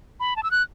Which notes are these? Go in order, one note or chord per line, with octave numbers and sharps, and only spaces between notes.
B5
A5
E6
F#6